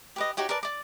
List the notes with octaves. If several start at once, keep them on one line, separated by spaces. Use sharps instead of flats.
G4 B4 D#5
D#4 F#4 G4 C#5
A#4 B4 D5 A5
D5 D6